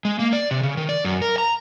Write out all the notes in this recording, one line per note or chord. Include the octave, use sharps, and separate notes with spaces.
G#3
A#3
D5
C3
C#3
D#3
D5
F#2
A#4
A#5